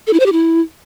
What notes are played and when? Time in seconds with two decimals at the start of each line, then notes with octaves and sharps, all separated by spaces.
0.07 A4
0.13 E4
0.20 C5
0.26 G4
0.32 E4